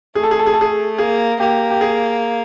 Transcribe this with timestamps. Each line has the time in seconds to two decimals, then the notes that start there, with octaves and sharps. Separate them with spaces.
0.15 A3 G#4
0.23 A4
0.31 G#4
0.39 A4
0.46 G#4
0.53 A4
0.61 G#4
0.98 A#3 G#4
1.40 A#3 G4
1.70 G4
1.81 G#4